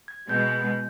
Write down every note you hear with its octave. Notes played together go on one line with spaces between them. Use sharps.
G#6
B2 G#3 B3 G6